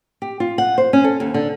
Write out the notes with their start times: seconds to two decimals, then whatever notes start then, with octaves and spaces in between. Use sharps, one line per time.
0.22 G4
0.40 F4
0.58 F#5
0.78 C5
0.93 C#4
1.04 A4
1.20 D#2
1.34 D3